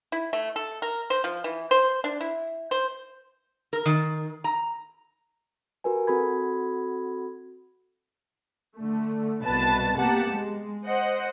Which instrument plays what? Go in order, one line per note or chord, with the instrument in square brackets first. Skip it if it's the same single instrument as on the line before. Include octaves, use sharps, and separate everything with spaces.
[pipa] E4
A3
A4
A#4
C5
F3
E3
C5
D4
E4
C5
[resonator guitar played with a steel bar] A#4
D#3
A#5
[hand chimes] F#4 G4 A#4 B4 G#5
C4 F#4 A4 B5 G#6
[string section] D3 A3
C2 B2 B4 A5 A6
A#3 B3 G4 F#5 A5
G#3
C5 D#5 F#5